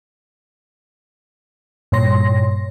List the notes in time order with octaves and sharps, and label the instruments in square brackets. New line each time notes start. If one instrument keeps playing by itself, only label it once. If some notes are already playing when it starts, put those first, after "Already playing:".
[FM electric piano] G2 A#2 C#5 C6 A#6